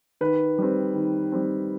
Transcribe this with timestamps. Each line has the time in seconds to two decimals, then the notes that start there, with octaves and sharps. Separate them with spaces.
0.21 D#3 B4
0.58 G3 C4
0.95 D#3
1.32 G3 C4